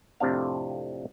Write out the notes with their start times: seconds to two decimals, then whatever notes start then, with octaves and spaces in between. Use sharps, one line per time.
0.20 F2 A2 C3 C4 D4 F5